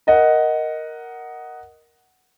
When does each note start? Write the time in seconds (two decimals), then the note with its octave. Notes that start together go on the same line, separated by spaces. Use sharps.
0.07 A#4 D#5 F#5